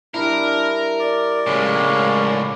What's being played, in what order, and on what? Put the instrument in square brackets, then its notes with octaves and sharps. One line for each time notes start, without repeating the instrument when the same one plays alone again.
[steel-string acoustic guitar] G3 E4 [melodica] D4 [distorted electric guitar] A#4
[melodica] D5
[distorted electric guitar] C#2 A2 [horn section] G#3 A#3 C#4